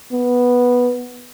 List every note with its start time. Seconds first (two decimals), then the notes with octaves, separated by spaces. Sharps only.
0.12 B3